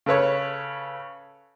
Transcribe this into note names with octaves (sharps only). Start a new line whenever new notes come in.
C#3 A4 B4 C#5